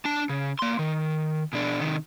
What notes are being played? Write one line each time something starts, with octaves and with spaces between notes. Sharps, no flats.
D4 A5
C#3
A#3 C6
D#3
B2 D4
C3 D#3